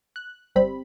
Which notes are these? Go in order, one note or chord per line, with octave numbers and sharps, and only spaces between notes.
F#6
G1 G3 C4 B5